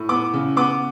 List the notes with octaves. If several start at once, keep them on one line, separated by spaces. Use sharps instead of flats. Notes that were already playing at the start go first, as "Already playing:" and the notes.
Already playing: A2
B3 D6
C#3
B3 D6